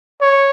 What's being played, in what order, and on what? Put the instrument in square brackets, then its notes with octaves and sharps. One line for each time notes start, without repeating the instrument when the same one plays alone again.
[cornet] C#5